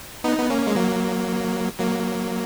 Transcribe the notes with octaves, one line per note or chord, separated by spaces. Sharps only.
B3 D#4
B3
A#3 C#4
G#3
F#3 A#3
F#3 A#3